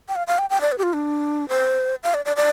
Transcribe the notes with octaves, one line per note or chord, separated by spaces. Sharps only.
G5
F5
F5
G5
G5
D5
B4
G4
F4
D4
C5
F5
D5
D5
D5